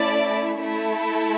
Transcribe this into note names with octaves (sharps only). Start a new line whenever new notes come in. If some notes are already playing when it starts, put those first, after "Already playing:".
Already playing: A3 C#4 E4 D5
A3 E4 A4